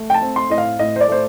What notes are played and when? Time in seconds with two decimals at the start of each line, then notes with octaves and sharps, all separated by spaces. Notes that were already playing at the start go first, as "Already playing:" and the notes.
Already playing: A3
0.10 G5
0.14 A5
0.21 C4
0.36 C6
0.50 A2 D#5
0.58 F5
0.79 A2 D#5
0.96 C5
1.01 D5
1.08 A3 C5